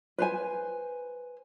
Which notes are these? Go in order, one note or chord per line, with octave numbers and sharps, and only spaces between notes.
B4 C5 G#5